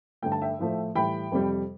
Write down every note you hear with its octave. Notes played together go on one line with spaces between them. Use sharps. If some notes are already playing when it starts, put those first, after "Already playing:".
G2 D3 A3 G5
A5
E5 G5
A2 F3 A3
A2 E3 G3 G5 B5
F2 C3 G3